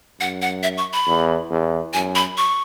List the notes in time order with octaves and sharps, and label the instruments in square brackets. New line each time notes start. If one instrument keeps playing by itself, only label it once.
[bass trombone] F#2 [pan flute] F#5
[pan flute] F#5
E5
C#6
B5
[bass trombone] E2
E2
[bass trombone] F#2 [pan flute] G#5
[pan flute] B5
C#6